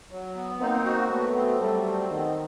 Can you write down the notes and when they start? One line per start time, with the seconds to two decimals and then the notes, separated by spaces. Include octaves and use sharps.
0.11 F#3
0.36 B3
0.60 A#3 C4 D#4
0.85 F#4
1.10 F#3 A3 B3
1.35 C4
1.61 F#3 G3 A3
1.85 C4
2.10 D#3 B3